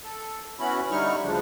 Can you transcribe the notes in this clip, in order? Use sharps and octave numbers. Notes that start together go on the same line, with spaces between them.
A4
B3 C#4 E4 F#4 B5
D3 G3 D#4 E4 C#6 F6
D2 C#3 F3 D4